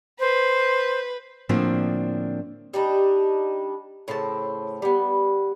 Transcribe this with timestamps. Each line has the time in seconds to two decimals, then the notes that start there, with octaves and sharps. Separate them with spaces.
0.19 B4 C5
1.49 A2 D3 F3 A#3 C4 D4
2.74 G3 D4 D#4
4.08 A2 C#3 C4 A5
4.82 G3 B3